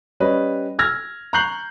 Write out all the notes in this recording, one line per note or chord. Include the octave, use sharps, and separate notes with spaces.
G3 C#4 B4 D#5
E6 F6 G#6 A#6
A#5 C#6 F#6 G6 C7 F#7